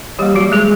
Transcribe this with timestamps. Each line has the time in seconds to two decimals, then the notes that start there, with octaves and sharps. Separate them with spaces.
0.19 E3 G3 A#3 G4
0.35 F#3 F#4
0.52 G#3 G#4